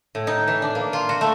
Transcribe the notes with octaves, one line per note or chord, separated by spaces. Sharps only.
A2
D#4
E3
D4
A#3
F4
F#4
A3